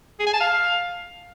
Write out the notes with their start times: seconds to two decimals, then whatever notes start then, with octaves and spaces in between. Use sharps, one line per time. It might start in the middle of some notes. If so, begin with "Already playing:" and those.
0.20 G#4
0.27 G#5
0.33 A5
0.40 F5